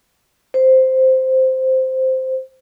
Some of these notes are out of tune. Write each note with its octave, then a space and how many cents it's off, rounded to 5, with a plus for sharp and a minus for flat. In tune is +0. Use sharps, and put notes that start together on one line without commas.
C5 -5